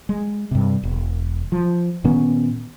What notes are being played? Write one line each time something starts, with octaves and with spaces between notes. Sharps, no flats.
G#3
G2 C3
E1
F3
A#2 D#3 B3 C#4